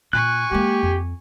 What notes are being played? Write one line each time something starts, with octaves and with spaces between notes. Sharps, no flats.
A#2 G#5 C#6 F#6
G#3 A#3 G4
F2